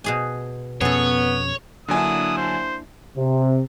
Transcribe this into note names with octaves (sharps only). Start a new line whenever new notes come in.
B2 G#4 G#5
F2 B2 B3 C#4 G#4 A4 C#5
D3 F#3 A#3 D4 E4 G#5 D#6
C5
C3